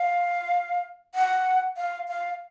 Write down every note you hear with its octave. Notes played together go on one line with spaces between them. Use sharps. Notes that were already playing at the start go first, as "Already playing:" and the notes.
Already playing: F5
F#5
F5
F5